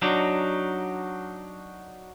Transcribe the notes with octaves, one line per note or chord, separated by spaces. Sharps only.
F#3 D4 D#4